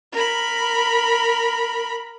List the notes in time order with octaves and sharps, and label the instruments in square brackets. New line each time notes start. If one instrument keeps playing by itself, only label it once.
[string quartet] A#4 B5